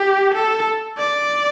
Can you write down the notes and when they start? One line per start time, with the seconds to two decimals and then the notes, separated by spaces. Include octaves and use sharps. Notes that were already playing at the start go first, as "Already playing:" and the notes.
Already playing: G4
0.34 A4
0.98 D5